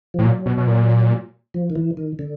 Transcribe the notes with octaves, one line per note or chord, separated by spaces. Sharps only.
A2 F3
A#2 F#3
B2
B2
A#2
F3
D#3
E3
D#3
D3